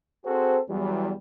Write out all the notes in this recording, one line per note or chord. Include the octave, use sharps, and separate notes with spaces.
C4 F#4 G#4 A4 C5
E2 F#3 G3